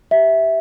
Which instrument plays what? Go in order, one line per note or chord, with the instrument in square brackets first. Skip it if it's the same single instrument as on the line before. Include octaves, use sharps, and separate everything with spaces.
[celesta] G4 E5